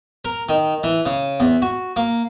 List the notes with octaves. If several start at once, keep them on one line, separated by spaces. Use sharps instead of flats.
A#4
D#3
E3
C#3
E2
F#4
A#3